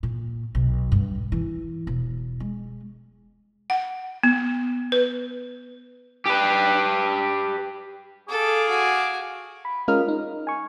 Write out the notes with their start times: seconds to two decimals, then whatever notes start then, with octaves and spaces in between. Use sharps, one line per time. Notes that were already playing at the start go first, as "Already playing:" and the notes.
0.03 A#2
0.55 B1
0.92 G2
1.32 E3
1.87 E1
2.40 G#3
3.70 F#5
4.23 B3
4.92 B4
6.26 G4 B4
8.29 G#4 A4 F5 D6
8.69 F#4 G#5
9.65 B5
9.88 G#3 C#4 F4 A#4 D#5 F6
10.08 D#4
10.47 G#5 C#6